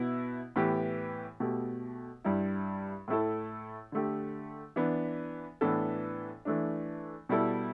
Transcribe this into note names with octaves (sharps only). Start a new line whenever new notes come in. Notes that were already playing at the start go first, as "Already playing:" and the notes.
Already playing: B2 B3 E4
A2 E3 B3 G4
B2 A3 G4
G2 G3 E4
A2 A3 E4 A4
D3 A3 G4
E3 B3 D4
A2 E3 B3 D4 A4
E3 A3 D4
B2 G3 E4 A4